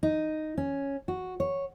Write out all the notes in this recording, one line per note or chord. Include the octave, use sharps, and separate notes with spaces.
D#4
C#4
F#4
C#5